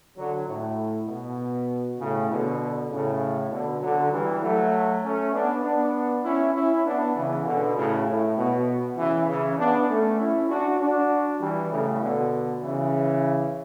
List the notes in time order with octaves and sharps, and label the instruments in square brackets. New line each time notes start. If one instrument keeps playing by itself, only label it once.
[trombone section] D3 F#3
A2
B2
A2 C#3
B2 D3
A2 C#3
B2 D3
D3 F#3
E3 G3
F#3 A3
A3 C#4
B3 D4
B3 D4
C#4 E4
C#4 E4
B3 D4
C#3 E3
B2 D3
A2 C#3
A2
B2
C#3 E3
C#3 E3
B3 D4
A3 C#4
C#4 E4
D4 F#4
D4 F#4
E3 G3
A2 C#3
B2 D3
C#3 E3